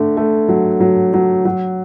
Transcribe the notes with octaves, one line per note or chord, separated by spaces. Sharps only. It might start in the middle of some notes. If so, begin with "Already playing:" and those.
Already playing: D3 A3
A3
F#3
F#3
F#3
F#3